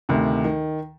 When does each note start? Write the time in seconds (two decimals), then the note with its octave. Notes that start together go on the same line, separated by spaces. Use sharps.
0.09 D2 C3 D#3
0.44 D#3